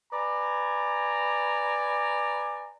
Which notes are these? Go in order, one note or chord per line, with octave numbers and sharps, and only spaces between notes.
B4 D5 G#5 A#5